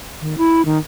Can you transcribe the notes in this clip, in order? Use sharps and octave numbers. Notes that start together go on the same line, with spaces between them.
D#3
E4
D#3